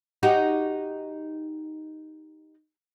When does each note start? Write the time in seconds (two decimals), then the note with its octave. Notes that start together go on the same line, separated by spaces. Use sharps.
0.23 D#4 F#4 G4